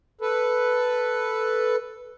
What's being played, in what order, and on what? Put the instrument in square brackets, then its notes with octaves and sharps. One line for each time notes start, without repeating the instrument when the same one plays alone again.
[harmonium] A4 B4